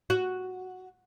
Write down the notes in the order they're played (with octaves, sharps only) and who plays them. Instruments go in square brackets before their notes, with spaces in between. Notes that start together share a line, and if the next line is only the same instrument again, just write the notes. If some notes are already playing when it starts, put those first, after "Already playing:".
[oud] F#4